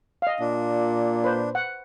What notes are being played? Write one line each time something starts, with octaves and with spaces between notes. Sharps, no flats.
D#5 F5
A#2 D4
B4 C5
F#5